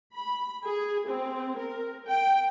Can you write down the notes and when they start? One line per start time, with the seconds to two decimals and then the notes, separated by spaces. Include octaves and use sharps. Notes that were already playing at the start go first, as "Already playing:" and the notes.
0.15 B5
0.64 G#4
1.09 C4
1.59 A#4
2.08 G5